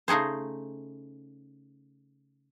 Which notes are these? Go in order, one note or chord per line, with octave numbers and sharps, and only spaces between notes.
C#3 A3 D#4 G#4 C5